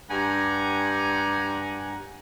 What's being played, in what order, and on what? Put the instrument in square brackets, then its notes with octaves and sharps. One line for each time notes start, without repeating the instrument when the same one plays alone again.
[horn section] G2 G4 F#5 G#5 A#5